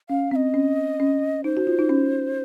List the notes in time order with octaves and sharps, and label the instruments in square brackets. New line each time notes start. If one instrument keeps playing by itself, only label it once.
[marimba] C#4 [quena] F5
[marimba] C4 [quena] F5
[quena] D#5
[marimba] C#4
C#4
[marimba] D#4 [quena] C5
[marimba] F#4
F4
D#4
C#4